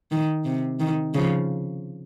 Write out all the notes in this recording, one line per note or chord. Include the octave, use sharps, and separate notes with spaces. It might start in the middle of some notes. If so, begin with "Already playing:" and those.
D#3
C3
D#3
C#3 F3